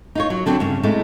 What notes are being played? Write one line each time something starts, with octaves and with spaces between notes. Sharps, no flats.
D#4 F4 C#5
F#3
D3 F#3 C4 D4
G2 C#3
A2 C3 G#3 A3